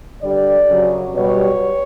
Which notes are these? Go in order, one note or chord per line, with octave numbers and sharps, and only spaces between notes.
G2 D3 G3 D5
F#2 C#3 F#3
B2 G3 C#5